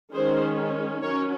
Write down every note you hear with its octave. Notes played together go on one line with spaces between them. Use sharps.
D#3 G#3 C#4 G#4 C5
F#3 C#4 A#4 C#5